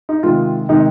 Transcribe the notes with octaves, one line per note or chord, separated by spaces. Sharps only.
D#4
C3 D#3 G#3 F4
C3 D#3 G#3 D#4